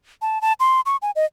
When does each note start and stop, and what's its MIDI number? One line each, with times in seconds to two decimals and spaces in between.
0.22 0.41 81
0.42 0.53 81
0.60 0.81 84
0.86 0.97 85
1.02 1.11 80
1.16 1.25 75